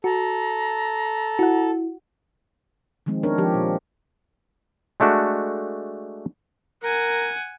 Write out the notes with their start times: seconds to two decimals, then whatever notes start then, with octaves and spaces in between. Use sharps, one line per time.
0.04 F#4 A4 A#5
1.39 E4 F#4 F#5
3.06 D#3 F3 G#3 C4
3.23 B3 D4 A#4 C#5
3.38 F3 G4
3.54 A#2
5.00 G#3 A3 D4 F#4
6.83 A#4 F#5 G#5